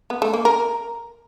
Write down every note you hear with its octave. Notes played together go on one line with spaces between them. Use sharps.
B3
A3
A#3
A#4